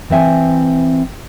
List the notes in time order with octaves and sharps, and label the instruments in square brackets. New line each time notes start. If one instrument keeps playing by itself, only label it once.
[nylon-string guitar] E3 C4 E5 G#5